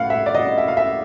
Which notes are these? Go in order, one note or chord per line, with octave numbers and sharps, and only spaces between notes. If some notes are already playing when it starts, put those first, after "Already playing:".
Already playing: A2 F5 F#5
E5
D5
D#5
E5
F5
E5